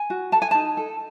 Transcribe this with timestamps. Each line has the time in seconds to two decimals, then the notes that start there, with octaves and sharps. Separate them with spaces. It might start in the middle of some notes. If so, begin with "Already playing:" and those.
Already playing: G#5
0.10 F#4
0.32 A4 A5
0.42 G#5
0.51 D#4 A5
0.77 A4